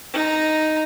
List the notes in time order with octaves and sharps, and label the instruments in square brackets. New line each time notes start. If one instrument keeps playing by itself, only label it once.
[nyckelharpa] D#4 A#5